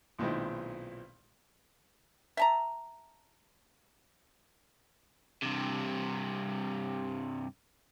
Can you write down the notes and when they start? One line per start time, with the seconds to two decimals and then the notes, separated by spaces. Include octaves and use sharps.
0.19 B1 A#2 D#3 G#3 C4 E4
2.37 E5 A5 A#5
5.42 G2 C3